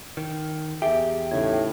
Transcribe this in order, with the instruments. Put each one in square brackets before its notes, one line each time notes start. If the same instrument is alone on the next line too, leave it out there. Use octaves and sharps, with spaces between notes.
[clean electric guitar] D#3
[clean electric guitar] E2 G4 [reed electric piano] G#4 [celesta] E5
[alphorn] A2 [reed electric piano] C#3 D#4 G#6